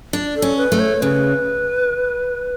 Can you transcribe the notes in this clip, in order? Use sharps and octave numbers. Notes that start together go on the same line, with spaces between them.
D4
A4
C#4
B4
A3
C#5
C#3 B4